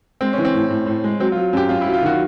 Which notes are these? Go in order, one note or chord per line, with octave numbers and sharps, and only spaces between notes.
G#3 C4
E3 C#4
C4
A2
A2
A2
G#3
F#3 C4
F4
F#3
F#2 G4
F#2 F4
E4
F#3
F4
D#3 F#4